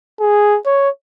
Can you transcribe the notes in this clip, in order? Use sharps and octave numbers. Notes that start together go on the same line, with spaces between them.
G#4
C#5